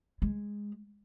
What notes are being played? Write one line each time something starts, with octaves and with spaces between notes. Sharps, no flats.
G#3